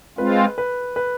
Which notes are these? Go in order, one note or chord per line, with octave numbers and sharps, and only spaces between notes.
G#3 C4 F4 B4
B4
B4